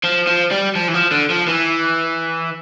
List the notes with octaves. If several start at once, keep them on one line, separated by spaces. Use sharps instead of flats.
F3
F3
G3
F3
E3
F3
D3
F3
E3